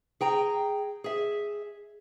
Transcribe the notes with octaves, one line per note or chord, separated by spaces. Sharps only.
G#4 G5 A#5
G#4 E5